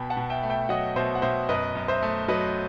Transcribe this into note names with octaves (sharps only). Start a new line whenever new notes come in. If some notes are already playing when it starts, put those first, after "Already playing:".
Already playing: B2 G5 B5
F#5 A5
B2
E5 G5
A3
E5 G5
F#3 D#5 F#5
B2 C5 E5
F#5
B2 C5 E5
F#2 B4 D#5
F#2
C5 E5
A3
F#3 B4 D#5